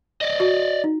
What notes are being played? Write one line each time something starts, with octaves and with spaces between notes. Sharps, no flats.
D5 D#5
F#4
D#4